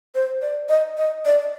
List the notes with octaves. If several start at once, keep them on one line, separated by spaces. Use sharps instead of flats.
C5
D5
D#5
D#5
D5